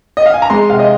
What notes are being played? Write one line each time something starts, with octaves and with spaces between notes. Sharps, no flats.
D#5
F5
G#5
A#5
G#3 C6
C3 F5
D#5